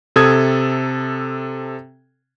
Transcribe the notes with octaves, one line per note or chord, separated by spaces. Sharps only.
C3 A4 D#6 G#6